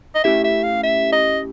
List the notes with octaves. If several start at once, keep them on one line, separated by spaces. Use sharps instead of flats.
D#5
A3 C#4 E4 G4 E5
E5
F5
E5
D#5